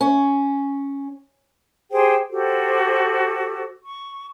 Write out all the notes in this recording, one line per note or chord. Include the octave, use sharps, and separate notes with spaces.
C#4
G4 G#4 C5 G5
F#4 G4 A4 C5
C#6